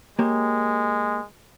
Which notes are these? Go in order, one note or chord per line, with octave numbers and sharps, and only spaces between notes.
G#3 A#3 G4 C#5